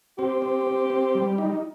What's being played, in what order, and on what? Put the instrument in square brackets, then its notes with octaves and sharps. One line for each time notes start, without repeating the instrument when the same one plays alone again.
[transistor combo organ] C4 [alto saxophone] G4
[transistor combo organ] C4
C4
C4
G3
D#4